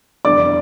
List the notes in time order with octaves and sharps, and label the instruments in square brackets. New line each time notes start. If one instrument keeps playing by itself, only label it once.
[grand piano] F1 E2 D3 G3 D4 [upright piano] D5 D6